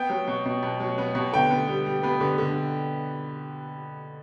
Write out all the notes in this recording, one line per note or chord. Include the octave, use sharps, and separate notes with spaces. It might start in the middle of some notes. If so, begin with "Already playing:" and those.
Already playing: B3 G5
F#3
B2
B2
B2
F#3
B3
B2
D3 G5
B3
G3
G3
B3 B4
D3
D3